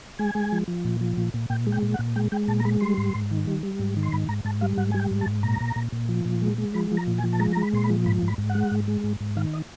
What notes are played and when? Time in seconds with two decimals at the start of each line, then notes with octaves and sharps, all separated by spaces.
0.19 G#3 G#5
0.35 G#3
0.52 F3
0.68 F3
0.85 A#2
1.01 F3
1.17 A#2
1.34 A#2
1.50 A#2 G5
1.67 G#3
1.72 G5
1.82 A#2
1.94 F#5
1.99 A#2
2.16 G#3 G5
2.32 G#3 G5
2.48 A#2 A5
2.60 A#5
2.65 G#3 B5
2.81 G3 C6
2.97 G#2
3.15 G#2
3.31 D#3
3.47 G3
3.63 G3
3.79 G#2
3.97 D#3
4.03 C6
4.12 G#2 B5
4.29 G#2 A#5
4.45 G#2 A5
4.61 G3 F5
4.77 G#2 F#5
4.91 G3 G#5
5.00 G5
5.11 G#2
5.21 A5
5.27 G#2
5.43 A#2 A#5
5.60 A#2
5.76 A#2
5.92 A#2
6.09 F3
6.25 A#2
6.42 G#3
6.58 G#3
6.74 F3 B5
6.91 F3
6.97 A#5
7.07 A#2
7.18 G#5
7.24 F3
7.33 A5
7.40 G#3 A#5
7.52 G#3 A#5
7.62 B5
7.73 A#2 C6
7.83 B5
7.90 F3
8.06 G#2 B5
8.22 G#2
8.28 B5
8.38 G#2
8.49 F#5
8.55 G#3
8.71 G#2
8.88 G#3
9.04 G#2
9.20 G#2
9.37 D#3 F5
9.53 D#5